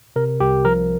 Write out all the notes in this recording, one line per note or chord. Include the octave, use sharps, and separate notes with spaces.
C3 A#4
C2 G4
F3 A#4